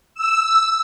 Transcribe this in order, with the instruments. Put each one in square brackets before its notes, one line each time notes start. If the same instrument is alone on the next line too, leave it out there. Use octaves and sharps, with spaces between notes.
[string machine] E6